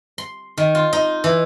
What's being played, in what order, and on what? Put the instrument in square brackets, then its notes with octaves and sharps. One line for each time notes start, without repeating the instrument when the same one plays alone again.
[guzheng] C6
D#3
F4
D#4
E3